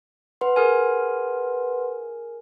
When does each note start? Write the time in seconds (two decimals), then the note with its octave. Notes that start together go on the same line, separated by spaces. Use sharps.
0.41 B4 F#5 C6
0.56 G#4 A#4 G#5